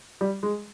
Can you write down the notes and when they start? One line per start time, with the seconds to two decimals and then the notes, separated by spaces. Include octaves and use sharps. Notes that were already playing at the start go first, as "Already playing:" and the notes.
0.21 G3
0.43 G#3